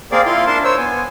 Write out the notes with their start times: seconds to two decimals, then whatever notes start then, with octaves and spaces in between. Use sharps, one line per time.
0.12 A#3 C4 G#4 A#4 D5 F5
0.25 E4 F4 F5 C6
0.47 D4 A#4 A5 C6
0.64 C5 C#5 E6
0.78 B3 G#5